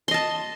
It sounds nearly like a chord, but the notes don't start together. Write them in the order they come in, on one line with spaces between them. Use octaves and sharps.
C6 D#5 A5